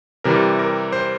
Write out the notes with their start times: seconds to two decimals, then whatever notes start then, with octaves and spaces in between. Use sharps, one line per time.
0.24 C3 E3 G3 A#4
0.59 A#4
0.92 C5